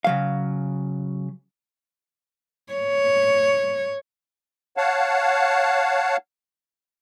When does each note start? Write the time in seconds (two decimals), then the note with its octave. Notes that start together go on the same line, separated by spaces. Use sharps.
0.04 C#3 F#3 F5
2.73 C#5
4.77 C#5 F5 F#5 A5